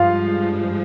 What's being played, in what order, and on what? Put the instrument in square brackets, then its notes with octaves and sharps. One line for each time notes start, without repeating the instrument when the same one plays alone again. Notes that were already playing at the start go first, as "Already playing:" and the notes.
Already playing: [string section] G2 F3 G#3 [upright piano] F4 F5